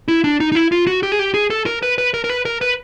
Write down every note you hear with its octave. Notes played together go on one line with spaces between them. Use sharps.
E4
D4
D#4
D#4
E4
F4
F#4
G4
G#4
G4
G#4
A4
A#4
B4
B4
A#4
A#4
B4
A#4
B4